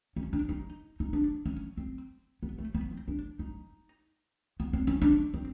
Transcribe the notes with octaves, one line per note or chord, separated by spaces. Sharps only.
C#4
D4
D#4
D#4
D4
C#4
C4
B3
A3
B3
C4
D4
D#4
B3
C4
C#4
D4
C4